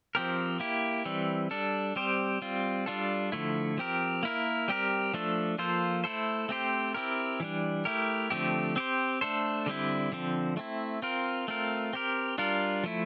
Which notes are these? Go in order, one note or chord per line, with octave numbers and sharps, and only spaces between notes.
F3 C4 G4 A#4
A#3 E4 G4
E3 G3 C4
G3 D4 A4
G3 C4 G4 C5
G3 C4 F4
G3 D4 F4 A4
D3 F3 A3 E4
F3 C4 G4 A#4
A#3 E4 A#4
G3 C4 G4 A#4
F3 A3 D4 A4
F3 A#3 F4 A4 C5
A3 E4 A4 C5
A3 C4 G4 C5
C4 E4 G4 A#4
E3 G3 D4
A3 E4 G4 A#4
D3 F3 A3 C4 G4
C4 G4 C5
A3 D4 A4 C5
D3 G3 C4 E4
D3 F3 C4
A3 C4 E4
C4 F4 A#4
A3 C4 F4 A#4
C4 G4 A#4
G3 D4 F4 A#4
F3 A3 E4